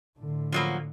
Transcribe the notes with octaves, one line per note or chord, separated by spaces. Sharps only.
A2 D3
F3 F#3 A#3